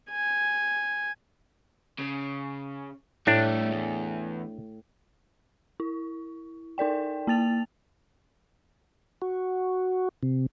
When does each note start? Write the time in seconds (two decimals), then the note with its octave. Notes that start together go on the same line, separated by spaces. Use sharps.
0.11 G#5
1.99 C#3
3.27 A2 G3 A3 D4
3.72 E2
5.80 E4
6.78 D#4 A#4 D5 G5
7.27 A#3 A5 A6 F7
9.22 F#4
10.23 C3